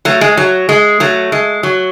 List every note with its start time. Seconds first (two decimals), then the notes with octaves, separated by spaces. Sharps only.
0.05 F#3 A3
0.21 G#3
0.37 F#3
0.69 G#3
1.00 F#3 A3
1.32 G#3
1.63 F#3